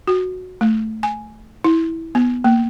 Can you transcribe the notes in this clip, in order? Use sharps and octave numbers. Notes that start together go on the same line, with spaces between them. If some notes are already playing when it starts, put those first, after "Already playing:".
F#4
A3
G#5
E4
B3
A#3